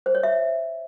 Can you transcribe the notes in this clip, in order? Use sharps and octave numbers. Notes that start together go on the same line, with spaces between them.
C5
C#5
E5